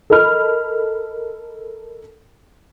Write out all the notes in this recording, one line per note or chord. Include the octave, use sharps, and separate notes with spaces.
A4 A#4 D#5 B5 F6